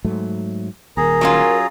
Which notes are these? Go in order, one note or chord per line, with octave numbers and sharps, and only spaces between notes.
G#2 F#3 A3
D#1 D#2 G#4 A#4 A#5
F#3 C#4 F4